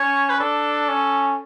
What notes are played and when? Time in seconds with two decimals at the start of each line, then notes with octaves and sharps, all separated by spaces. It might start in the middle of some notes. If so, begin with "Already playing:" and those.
Already playing: C#4 C#5
0.30 B4
0.40 D4 A4
0.89 C#4